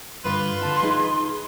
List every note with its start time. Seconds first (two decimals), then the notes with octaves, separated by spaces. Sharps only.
0.24 G2 D3 F4 B4 C6
0.61 D3 A5
0.83 D#4 G#4